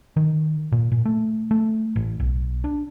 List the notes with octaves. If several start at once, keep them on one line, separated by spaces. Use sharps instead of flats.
D#3
A#2
A#2
A3
A3
A1
B1
D4